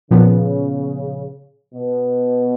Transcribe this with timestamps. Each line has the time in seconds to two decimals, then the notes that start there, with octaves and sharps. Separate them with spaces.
0.11 A#2 C#3 F3 B3
1.74 B2